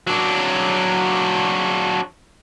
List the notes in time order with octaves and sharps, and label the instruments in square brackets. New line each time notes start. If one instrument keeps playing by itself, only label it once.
[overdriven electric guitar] F#3 D4